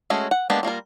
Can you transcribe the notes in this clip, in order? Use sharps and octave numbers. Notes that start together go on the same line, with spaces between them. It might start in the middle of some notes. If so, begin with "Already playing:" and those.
G#3 A3 C#4 F#4 G#4
F#5
G#3 A#3 B3 D4 G4
G3 A#3 F4 A#4